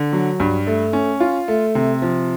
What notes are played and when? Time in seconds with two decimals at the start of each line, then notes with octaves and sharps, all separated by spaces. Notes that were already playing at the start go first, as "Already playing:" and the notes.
Already playing: D3
0.13 F#3
0.40 G2
0.67 A3
0.93 C#4
1.20 F4
1.48 A3
1.75 C3
2.02 F3